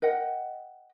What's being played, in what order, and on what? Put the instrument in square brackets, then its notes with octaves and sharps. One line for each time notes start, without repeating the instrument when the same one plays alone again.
[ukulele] A#4 D#5 F#5 G5